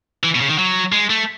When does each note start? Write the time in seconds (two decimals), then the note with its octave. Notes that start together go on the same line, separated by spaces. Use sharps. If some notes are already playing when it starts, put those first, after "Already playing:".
0.24 E3
0.35 B2
0.41 C#3
0.49 D#3
0.58 F#3
0.92 G#3
1.10 A3